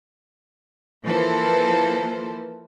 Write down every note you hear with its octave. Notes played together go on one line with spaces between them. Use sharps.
E3 F3 A#3 A4 B4 C5